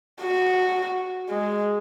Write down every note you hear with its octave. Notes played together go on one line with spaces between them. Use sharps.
F#4
G#3